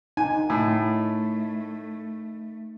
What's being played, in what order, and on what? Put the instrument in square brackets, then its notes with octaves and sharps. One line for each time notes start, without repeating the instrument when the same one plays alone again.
[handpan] D#4 [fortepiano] G#5
[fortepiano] A2 [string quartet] A3